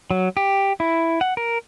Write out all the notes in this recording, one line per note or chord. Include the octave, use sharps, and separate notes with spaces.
F#3
G4
E4
F#5
A#4